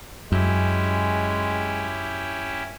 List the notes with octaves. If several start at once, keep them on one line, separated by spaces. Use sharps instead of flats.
F#2 G#3 C#4 E4 G4